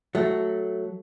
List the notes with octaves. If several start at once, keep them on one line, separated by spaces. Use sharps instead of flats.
F#3 A3